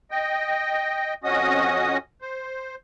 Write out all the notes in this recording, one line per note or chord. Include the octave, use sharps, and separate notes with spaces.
D#5 G5
F2 C#4 F#4 D#5 D#6
C5